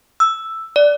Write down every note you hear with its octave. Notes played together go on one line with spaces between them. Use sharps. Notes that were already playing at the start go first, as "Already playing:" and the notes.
E6
D5